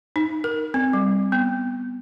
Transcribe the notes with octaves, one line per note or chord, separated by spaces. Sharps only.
D#4
A#4
C4
G3
B3